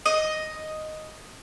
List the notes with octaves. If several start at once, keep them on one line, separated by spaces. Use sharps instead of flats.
D#5